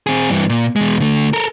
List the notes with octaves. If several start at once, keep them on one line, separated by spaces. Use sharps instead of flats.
C4 G#4
G2 E3
A#2
E2 G#3
D3 A3
A4 A#4